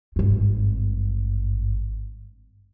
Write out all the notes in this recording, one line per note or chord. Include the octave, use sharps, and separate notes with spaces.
G#1 G2